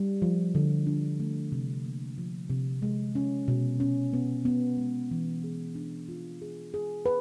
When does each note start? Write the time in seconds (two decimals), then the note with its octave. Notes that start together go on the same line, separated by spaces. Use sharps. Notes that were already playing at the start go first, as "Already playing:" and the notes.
Already playing: G3
0.22 F3
0.55 D3
0.87 D4
1.20 A3
1.52 C3
1.85 A#3
2.18 F3
2.50 C3
2.82 G#3
3.15 C#4
3.48 B2
3.80 C#4
4.13 B3
4.45 B3
4.78 G#3
5.11 E3
5.44 G#4
5.75 D4
6.09 F4
6.42 G#4
6.74 G#4
7.06 B4